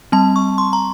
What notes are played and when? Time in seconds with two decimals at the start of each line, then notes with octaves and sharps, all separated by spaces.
0.12 G3 C4 A5
0.36 C#6
0.58 C6
0.73 A#5